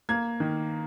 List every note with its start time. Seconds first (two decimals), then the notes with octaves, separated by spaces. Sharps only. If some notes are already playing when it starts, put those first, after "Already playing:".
0.09 A#3 G#6
0.40 D#3